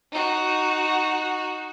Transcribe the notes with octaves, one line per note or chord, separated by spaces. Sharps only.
D#4 F#4